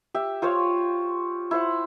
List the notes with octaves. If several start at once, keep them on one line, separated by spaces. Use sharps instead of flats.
G4 E5
F4 C5 C#5 F5
E4 C5 F#5